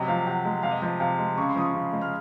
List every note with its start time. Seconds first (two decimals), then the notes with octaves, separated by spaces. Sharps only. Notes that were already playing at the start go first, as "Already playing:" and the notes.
Already playing: C3 F#3 D#5
0.08 F3 F5
0.27 C3 F#5
0.45 G#3
0.63 C3 F5
0.71 D#5
0.82 F3 D#5
1.00 C3 F5
1.19 G#3
1.37 C#3 C#6
1.49 C6
1.56 F3 D#6
1.62 C#6
1.74 C#3
1.93 G#3
2.01 F6